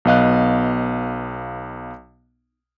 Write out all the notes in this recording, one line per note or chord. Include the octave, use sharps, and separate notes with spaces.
B1 B3 D#5 F5 F#6